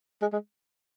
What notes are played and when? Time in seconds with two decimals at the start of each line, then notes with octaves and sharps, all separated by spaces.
0.22 G#3
0.33 G#3